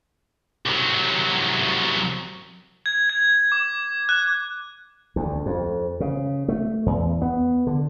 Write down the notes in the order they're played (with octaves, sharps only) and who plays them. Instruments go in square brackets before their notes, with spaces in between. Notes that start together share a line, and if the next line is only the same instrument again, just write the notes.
[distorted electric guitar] C2 F#3
[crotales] G#6
G#6
D6
F#6
[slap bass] D2
F2
C#3
A3
E2
B3
D3